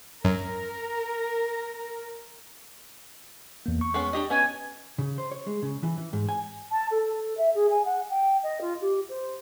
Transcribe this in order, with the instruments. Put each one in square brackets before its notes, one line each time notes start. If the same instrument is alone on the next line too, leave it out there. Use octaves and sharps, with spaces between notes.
[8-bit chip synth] F#2 [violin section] A#4
[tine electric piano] E2 A#3
C#6
[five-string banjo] G#3 B3 C#4
D4 G4 D#5
[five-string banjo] B3 C#4 [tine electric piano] B4 D#5 [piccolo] G#5
[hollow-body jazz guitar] C#3
C5
C#5
G#3
C#3
E3
E3
G#2
G#5
[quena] A5
A4
E5
G#4
G#5
F#5
G5
D#5
F4
G4
C5